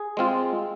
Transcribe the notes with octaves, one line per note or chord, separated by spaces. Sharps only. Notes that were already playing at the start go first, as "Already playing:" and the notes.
Already playing: G#4
G#3 C4 F4